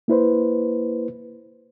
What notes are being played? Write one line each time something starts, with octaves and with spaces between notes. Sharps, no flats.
A#3 E4 B4 C5